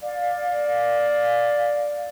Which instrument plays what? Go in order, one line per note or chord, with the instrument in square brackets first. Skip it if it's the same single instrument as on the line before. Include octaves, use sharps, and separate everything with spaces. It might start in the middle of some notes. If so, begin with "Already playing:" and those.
[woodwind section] D5 F5